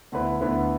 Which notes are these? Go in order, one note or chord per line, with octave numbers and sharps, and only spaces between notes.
D2 D3 B3 E4 B4
D2 D3 B3 E4 B4